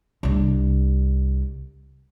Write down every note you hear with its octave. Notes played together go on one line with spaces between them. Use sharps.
C2 D4